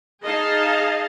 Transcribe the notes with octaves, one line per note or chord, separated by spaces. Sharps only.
D#4 G#4 D#5 F5 A5